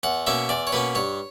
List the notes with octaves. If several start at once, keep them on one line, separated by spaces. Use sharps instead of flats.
E2 F#5
B2 A#3 C#4 E5
E2 D5
C#5
B2 A#3 C#4 B4
G2 C#5